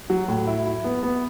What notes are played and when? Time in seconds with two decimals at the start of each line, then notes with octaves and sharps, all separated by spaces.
0.10 F#3
0.28 A2
0.47 E4
0.65 E4
0.84 B3
1.03 B3